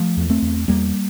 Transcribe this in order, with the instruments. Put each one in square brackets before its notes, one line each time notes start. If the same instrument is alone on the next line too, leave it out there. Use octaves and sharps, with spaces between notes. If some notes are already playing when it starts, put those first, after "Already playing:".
Already playing: [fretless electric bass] F3 A3
E2
A3 C4
E2
E2 G3 A#3